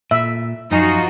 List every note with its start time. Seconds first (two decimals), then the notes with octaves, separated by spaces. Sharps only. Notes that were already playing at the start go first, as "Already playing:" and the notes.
0.11 A#2 E5
0.71 F#2 F3 D#4 F4 F#4 G#5